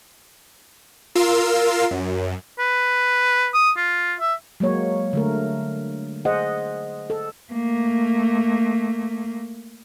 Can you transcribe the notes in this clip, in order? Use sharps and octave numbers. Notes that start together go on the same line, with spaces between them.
F4 A#4 F5 C6 E6
F#2
B4
D#6
F4
E5
F#3 G#3 A#3 C#5
D3 A3 A#4
G#4 C5 D#5 F#5
A4
A3 A#3